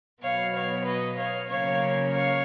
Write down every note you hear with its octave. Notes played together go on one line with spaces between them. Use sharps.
B2 F#3 B3 C#5 F5
C#5 F5
B4 D#5
C#5 F5
C#3 F#3 A#3 C#4 C#5 F5
C#5 F5